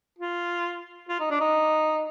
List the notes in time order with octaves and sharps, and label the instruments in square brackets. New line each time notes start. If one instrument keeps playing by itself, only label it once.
[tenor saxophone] F4
F4
D#4
D4
D#4